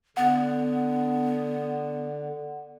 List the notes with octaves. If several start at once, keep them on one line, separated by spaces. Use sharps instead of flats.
D3 B3 F#5